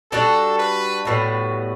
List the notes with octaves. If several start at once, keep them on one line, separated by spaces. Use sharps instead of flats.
G3 D4 F#4 A4
B4
A2 G3 B3 F#4